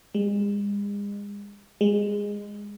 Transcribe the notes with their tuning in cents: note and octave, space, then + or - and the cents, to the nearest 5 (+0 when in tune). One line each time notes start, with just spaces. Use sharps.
G#3 -40
G#3 -15